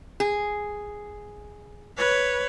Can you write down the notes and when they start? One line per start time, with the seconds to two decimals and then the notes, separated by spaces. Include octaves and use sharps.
0.20 G#4
1.97 B4 C#5